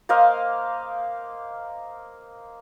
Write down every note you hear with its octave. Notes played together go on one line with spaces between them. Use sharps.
A#3 C5 D#5 F5